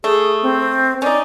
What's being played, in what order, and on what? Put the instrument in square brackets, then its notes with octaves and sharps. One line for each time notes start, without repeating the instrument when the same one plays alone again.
[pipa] A3 [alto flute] G#4
[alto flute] C4
[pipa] C#4 D#4 [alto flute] D5